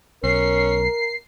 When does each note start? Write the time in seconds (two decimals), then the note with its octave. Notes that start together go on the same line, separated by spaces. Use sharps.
0.24 B1 C#4 A#4 C7